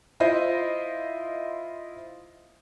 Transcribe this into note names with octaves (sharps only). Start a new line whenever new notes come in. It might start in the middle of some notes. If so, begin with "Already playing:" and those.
E4 F4 C5 D#5